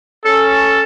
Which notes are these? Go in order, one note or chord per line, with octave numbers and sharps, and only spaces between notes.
C#4 A4